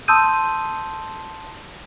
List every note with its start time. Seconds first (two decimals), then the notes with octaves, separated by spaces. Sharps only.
0.08 A5 C6 D#6 E6 G6 D#7